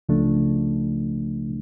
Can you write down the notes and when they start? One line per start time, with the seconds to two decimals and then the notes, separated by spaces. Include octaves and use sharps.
0.09 C#2 C#3 F3 A3 D4